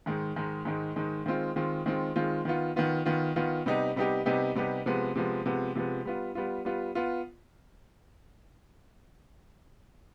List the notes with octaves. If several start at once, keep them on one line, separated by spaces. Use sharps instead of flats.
G#2 D#3 G#3
G#2 D#3 G#3
G#2 D#3 G#3
G#2 D#3 G#3
D#3 G#3 C4 F4
D#3 G#3 C4 F4
D#3 G#3 C4 F4
D#3 G#3 C4 F4
D#3 B3 F4
D#3 B3 F4
D#3 B3 F4
D#3 B3 F4
C3 G3 B3 D#4 G4
C3 G3 B3 D#4 G4
C3 G3 B3 D#4 G4
C3 G3 B3 D#4 G4
C3 F3 G#3 B3
C3 F3 G#3 B3
C3 F3 G#3 B3
C3 F3 G#3 B3
G3 B3 F4
G3 B3 F4
G3 B3 F4
B3 F4